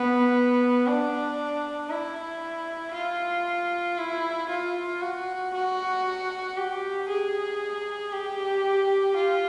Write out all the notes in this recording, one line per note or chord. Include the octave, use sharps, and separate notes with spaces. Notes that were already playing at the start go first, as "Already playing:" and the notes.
Already playing: B3
D4
E4
F4
E4
F4
F#4
F#4
G4
G#4
G4
F4